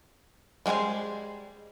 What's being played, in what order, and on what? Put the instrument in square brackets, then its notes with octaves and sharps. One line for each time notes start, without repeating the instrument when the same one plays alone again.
[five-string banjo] G3 G#3 F#4 G#4 C5